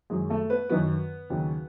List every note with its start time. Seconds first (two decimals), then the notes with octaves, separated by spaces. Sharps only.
0.10 F#2 D#3 F#3 G#3 G#4
0.30 A3 A4
0.50 B3 B4
0.69 F#2 D#3 F#3 B3 B4
1.30 D#2 C#3 F#3